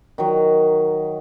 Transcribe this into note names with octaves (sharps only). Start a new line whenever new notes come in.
D#3 F#3